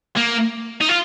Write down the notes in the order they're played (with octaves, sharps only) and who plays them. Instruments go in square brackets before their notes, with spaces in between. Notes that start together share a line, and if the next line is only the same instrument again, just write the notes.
[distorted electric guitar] A#3
D#4
F4